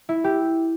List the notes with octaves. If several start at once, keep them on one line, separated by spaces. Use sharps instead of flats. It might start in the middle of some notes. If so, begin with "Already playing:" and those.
E4
G4